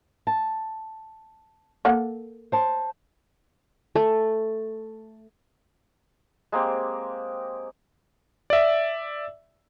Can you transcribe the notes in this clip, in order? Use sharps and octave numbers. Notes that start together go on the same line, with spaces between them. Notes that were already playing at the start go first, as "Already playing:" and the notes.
A5
A#3 A4 F#5
C5 A5
A3
G#3 A#3 C4 G4
D5 E5